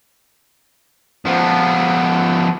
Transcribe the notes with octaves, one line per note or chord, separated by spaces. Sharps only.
F3 B3